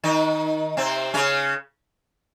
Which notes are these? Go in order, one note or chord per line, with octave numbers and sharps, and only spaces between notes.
D#3 D#4
C3 C4
C#3 C#4